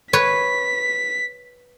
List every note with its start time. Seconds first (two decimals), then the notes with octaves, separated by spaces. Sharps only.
0.13 B4 C#5 B6